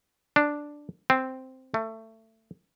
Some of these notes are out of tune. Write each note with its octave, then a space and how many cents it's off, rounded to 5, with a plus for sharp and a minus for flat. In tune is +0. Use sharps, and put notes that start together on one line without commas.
D4 +0
C4 -5
A3 +20